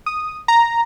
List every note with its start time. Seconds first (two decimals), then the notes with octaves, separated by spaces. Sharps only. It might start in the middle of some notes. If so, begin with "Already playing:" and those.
0.06 D#6
0.48 A#5